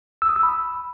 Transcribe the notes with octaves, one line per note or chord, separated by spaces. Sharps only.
E6
D#6
E6
B5